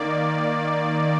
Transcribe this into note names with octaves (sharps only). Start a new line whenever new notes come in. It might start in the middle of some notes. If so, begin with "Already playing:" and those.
Already playing: D#3 A#3 D5